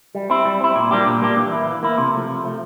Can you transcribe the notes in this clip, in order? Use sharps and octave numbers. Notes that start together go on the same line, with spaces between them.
G3
C4 E4
G3
C4 E4
A#2
G3 A#3 D4 G4
A#2
G3 A#3 D4 G4
E3
A#3 E4
E3
A#3 E4
C3
F3 A3
C3
F3 A3